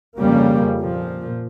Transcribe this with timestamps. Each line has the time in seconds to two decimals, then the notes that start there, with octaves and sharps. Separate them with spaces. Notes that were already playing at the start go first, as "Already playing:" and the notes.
0.18 F2 C#3 G3 A#3
0.80 A#2 F3